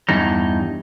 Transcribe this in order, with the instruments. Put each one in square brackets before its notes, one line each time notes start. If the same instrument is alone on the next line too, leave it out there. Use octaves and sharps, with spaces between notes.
[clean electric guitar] E2 G2 D#4